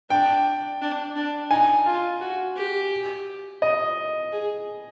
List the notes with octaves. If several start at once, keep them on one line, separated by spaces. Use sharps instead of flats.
D4 G5
D4
D4
D#4 G#5
F4
F#4
G4
D#5
G#4